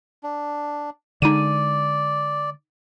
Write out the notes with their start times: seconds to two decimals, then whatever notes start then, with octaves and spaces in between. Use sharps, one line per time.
0.23 D4
1.22 D3 G#3 D#4 D5 D#7